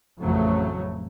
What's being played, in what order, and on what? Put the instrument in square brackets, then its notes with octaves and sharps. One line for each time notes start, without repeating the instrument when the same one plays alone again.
[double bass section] A1 F2 C#3 F#3 A3